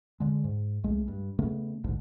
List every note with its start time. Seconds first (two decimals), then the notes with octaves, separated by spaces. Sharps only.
0.20 D3 G#3
0.44 G#2
0.84 C2 G#3 A3
1.08 G2
1.39 C#3 A3 B3
1.84 A1 D2 G#2 D3